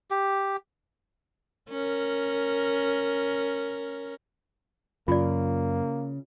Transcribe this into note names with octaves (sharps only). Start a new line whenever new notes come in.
G4
C#4 A#4
F#2 C#3 A#3 F4 D5